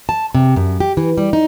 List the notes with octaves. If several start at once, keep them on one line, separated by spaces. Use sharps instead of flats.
A5
C3
F#2
G4
E3
G3
D#4